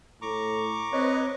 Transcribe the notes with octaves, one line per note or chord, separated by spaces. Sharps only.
A2 A#5 C#6 D6
C4 B4 C#5 D#5